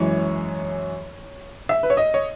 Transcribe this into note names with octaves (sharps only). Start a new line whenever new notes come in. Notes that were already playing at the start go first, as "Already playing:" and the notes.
Already playing: F#2 E3 G#3 C#5
E5
B4
C#5
D#5
C#5